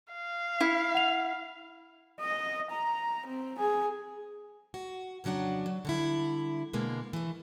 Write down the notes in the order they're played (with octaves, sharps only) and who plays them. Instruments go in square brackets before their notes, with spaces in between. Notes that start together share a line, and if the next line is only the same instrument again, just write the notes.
[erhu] F5
[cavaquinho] E4
[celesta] F#5 F7
[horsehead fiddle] D#5
A#5
C4
G#4
[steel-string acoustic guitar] F#4
F2 C#3 F#3 D4 F#5
F#3
D3 G3 E4
B2 D3 G#3 A#3
E3 A3